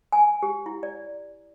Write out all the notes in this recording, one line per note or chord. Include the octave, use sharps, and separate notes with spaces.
G#5
G4
E4
D5